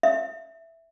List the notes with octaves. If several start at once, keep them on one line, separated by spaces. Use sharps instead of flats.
E5